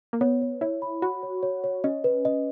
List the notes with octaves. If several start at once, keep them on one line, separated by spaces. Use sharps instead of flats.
A#3
B3 C#5
C#5
E4 C#5
B5
F#4 B5
C#5
C#5
C#5
C#4 D#5
B4
D#5